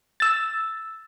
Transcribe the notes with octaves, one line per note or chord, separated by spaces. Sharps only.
E6 A6